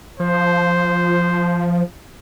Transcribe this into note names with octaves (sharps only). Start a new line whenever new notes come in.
F3 C5